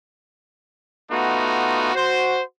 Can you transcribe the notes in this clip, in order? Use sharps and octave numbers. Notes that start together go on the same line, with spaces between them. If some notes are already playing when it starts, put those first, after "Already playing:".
A3 B3 D#4 F4 F#4
F#4 C5